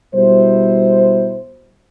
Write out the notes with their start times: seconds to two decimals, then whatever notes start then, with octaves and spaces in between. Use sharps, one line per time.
0.14 B2 G3 E4 C5